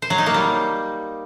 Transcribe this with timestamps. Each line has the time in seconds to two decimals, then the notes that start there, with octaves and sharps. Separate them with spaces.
0.02 C5
0.10 F#3
0.18 D#4
0.26 A#3
0.34 G3